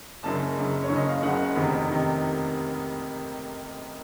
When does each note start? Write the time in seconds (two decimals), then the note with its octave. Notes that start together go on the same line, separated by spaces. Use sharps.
0.23 F#1 F#2 C#3 A5
0.56 F#1 F#2 C#3
0.82 C#5
0.89 F#1 F#2 C#3
0.96 D#5
1.09 F5
1.23 F#1 F#2 C#3 F#5
1.56 F1 F2 C3 D#3
1.90 C3 D#3